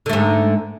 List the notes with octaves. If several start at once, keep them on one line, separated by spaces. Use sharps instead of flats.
G#2 D3 A3